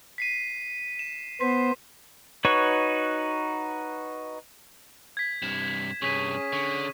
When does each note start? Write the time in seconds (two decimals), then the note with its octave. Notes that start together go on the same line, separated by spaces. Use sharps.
0.18 B6 C7 D#7
0.99 E7
1.41 B3 C5 B6
2.45 D#4 F#4 B4 C#5 C#6
5.17 G#6 B6
5.42 G2 C3 E7
6.02 C2 G2 C#4 G#4 C#6 F6 B6 D#7
6.53 D3 C#6